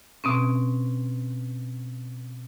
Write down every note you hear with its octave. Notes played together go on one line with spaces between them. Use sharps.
B2 C4 C#4